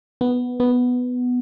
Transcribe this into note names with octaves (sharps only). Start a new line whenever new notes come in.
B3
B3